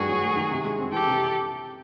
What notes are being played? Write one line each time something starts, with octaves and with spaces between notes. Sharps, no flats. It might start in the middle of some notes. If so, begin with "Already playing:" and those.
Already playing: G2 D#3 A3 F#4 G#4
F#3
A3
D#3
C3
G#3
C4
E3 G4 A4
C3